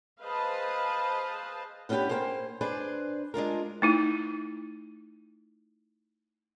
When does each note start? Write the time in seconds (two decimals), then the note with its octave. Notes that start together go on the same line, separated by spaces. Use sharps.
0.22 G#4 B4 C5 D#5 F5 A5
1.89 B3 C#4 D4 F4 G4 B4
2.09 A#3 G#4 C5 F5 G5
2.61 D4 G#4 B4 C5 D5
3.34 G#3 D4 F4 A#4
3.82 A3 D#4 E4